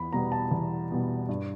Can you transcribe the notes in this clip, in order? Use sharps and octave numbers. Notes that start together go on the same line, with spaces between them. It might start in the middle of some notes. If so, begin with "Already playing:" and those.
Already playing: E2 B5
B2 G3 B3 A#5
A5
E2
B2 G3 B3
G2